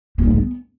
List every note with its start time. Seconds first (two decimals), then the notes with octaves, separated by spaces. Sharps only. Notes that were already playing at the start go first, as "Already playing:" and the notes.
0.18 A#3
0.24 D4
0.31 G#3
0.37 B3